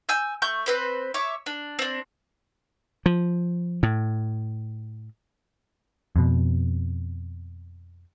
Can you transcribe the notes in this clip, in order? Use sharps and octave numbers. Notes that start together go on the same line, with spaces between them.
G#5 E6 G6
A3 C#6 G6
C4 B4 C5
C#5 E5 C#6 D6
D4
C4 D4
F3
A2
F2 B2